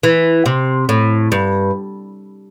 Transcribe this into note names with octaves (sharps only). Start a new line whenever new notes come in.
E3
C3
A2
G2